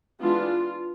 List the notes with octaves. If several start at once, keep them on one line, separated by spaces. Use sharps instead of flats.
E3 G#3 B3 D4 F4